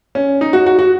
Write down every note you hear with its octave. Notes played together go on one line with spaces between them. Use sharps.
C#4
D#4
F#4
F#4
F#4